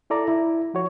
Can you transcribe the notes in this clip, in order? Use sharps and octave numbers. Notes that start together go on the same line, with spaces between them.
E4 A4 D5 A#5
E4
F3 F#4 C#5